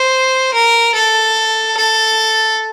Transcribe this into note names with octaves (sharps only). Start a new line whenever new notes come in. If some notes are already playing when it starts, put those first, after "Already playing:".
Already playing: C5
A#4
A4
A4